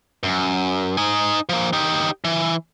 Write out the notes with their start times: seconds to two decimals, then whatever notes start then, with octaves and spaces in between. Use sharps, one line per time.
0.23 F#2
0.97 D#4 G#5
1.49 F3 A#3
1.73 D#4 G4
2.24 E3